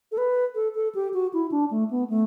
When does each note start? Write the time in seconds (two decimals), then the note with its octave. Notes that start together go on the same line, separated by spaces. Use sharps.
0.12 A4
0.18 B4
0.55 A4
0.75 A4
0.95 G4
1.14 F#4
1.33 E4
1.51 D4
1.71 A3
1.91 B3
2.10 A3